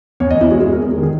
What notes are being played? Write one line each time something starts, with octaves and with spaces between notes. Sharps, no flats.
E2 C#5
D#5
E2
E4
G#3 F#4
G#4
E2
A#4
E2 G#4
G#4
D#3
G#4